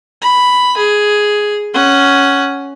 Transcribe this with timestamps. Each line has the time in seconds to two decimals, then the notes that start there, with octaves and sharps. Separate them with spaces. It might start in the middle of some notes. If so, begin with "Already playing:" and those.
0.22 B5
0.77 G#4
1.74 C#4 F#5